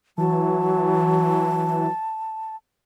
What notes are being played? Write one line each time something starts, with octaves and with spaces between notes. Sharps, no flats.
E3 F#3 A5